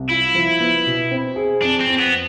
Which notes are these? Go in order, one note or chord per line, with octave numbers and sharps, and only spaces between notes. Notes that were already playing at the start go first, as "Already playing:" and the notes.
Already playing: C2
E4 F4
F3
B3
B2
C4
G#4
F2 D4
C4
F2
B3